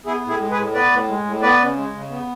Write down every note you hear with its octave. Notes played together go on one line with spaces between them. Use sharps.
B3 E4 G#4
A2 E4 G#4
G#3
G#4 B4
A2
B3 B4 D5
A2
G#3
A2
B3 B4 D5
C#3
G#3
C#3
B3